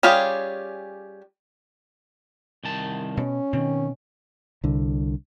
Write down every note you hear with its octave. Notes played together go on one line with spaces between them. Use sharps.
G3 C#4 F4 G4 G#4
C2 D#3 A5
B2 C#4
B2 D#3 C4
C2 D3